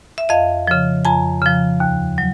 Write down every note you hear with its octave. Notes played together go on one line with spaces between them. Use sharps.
E5
F2 D#5 F5
C#3 F3
F2 G#5 A#5
C#3 F3
D#2
F#3